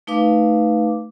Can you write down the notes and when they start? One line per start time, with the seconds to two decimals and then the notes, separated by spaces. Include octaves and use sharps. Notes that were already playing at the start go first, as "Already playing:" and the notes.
0.07 A3 D#4 B4 F5 D6